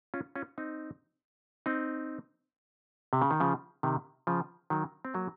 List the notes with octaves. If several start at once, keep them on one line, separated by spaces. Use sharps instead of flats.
C#4 F4
C#4 F4
C4 D#4
C4 D#4
C3
C#3
D#3
C#3 F3
C3 D#3
C#3 F3
D#3 F#3
C4
F#3 A#3